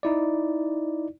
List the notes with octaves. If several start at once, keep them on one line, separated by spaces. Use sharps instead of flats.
D#4 E4 D5